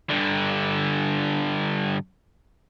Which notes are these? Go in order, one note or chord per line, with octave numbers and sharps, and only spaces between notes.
G2 D3